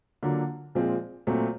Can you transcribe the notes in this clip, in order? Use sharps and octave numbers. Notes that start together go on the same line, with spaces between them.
D3 F#3 A#3 D4 F4
A#2 F3 G#3 C4
A#2 F#3 A3 C4